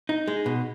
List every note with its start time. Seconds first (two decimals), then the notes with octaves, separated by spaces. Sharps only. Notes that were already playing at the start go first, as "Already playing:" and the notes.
0.09 D#4
0.28 G#3
0.46 B2